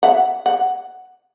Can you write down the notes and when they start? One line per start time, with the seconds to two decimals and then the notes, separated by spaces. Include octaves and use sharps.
0.03 E5 F#5
0.46 F#5